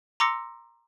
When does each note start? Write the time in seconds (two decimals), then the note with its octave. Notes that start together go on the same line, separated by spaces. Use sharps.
0.20 A#5 C6 D6 E6 A#6 C#7